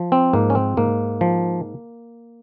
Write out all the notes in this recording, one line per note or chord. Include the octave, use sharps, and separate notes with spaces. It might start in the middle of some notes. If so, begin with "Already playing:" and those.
Already playing: F3
C4
G#2 A#3
C#4
C4
G#2 A#3
F3